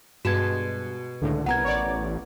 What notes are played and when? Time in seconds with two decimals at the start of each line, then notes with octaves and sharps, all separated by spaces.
0.25 G2 B2 G#3 F#4 A5 G#6
1.22 C#2 A2 D3
1.46 C2 B3 A#4 F#5 A#5 G#6
1.65 A1 C#5 D5